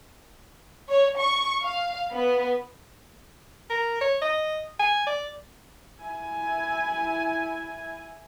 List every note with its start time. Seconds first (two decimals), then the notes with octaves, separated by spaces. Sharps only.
0.89 C#5
1.18 C#6
1.63 F5
2.12 B3
3.70 A#4
4.01 C#5
4.22 D#5
4.79 G#5
5.07 D5
6.01 E4 G#5